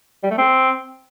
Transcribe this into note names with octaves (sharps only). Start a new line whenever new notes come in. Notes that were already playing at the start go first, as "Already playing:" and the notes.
G3
A3
C4